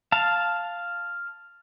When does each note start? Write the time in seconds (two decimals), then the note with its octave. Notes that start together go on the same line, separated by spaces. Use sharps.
0.12 F5 A5